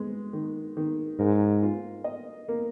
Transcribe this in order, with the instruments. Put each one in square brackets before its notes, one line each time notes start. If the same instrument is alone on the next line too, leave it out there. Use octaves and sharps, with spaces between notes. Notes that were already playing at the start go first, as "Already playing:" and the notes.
Already playing: [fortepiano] G#3 B3
D#3
D#3
[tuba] G#2 [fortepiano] A#4
[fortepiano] F4
D#5
A#3